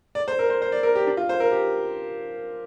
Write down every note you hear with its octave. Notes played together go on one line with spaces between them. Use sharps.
D5
C5
A#4
C5
C5
D5
A#4
G4
D4
F4
C5
A#4
G4